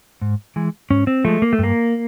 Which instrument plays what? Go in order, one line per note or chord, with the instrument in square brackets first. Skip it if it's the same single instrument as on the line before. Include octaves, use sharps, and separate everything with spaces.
[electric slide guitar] G#2
E3 G#3
G#2 C#4
C4
F3 G#3 A3
A#3
A3
G2 A#3